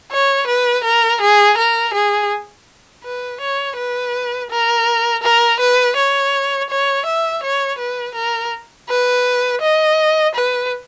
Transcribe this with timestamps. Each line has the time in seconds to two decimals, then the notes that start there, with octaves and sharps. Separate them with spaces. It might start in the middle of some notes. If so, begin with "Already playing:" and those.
0.12 C#5
0.47 B4
0.84 A#4
1.21 G#4
1.58 A#4
1.94 G#4
3.04 B4
3.41 C#5
3.76 B4
4.50 A#4
5.23 A#4
5.60 B4
5.96 C#5
6.70 C#5
7.05 E5
7.43 C#5
7.79 B4
8.15 A#4
8.89 B4
9.61 D#5
10.35 B4